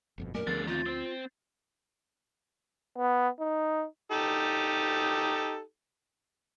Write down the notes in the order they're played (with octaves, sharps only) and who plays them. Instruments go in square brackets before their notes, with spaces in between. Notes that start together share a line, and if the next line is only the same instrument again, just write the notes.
[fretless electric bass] G1 F2 B2
[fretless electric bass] F#2 A#2 [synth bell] A3 [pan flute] A#4
[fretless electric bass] D2 F3 B3 [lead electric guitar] D3 G#4 [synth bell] A6
[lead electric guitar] D#3 C4 [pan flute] F4
[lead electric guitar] C4 C5
[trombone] B3
D#4
[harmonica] D#4 G4 A4